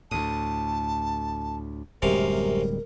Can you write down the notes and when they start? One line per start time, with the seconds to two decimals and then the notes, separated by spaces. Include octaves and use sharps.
0.11 D2 A2 A5 D#6
2.02 D1 F#2 C3 G3 G#3 A#4 F5